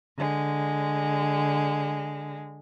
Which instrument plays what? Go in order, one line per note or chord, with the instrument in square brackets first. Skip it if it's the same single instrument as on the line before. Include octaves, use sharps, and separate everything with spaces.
[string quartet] D3 G#3